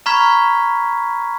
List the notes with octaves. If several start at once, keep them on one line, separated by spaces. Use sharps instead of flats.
A#5 B5 C#6 F6 G#6 B6